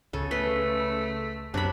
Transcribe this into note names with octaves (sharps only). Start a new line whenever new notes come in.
C#2 C#3 A4
A3 B4 C6
F#2 C3 F#3 D4 B5